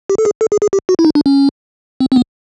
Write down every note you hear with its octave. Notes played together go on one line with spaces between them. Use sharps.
G4
A4
G#4
A4
G#4
G#4
G4
F#4
E4
D#4
D4
C#4
C4
C4
B3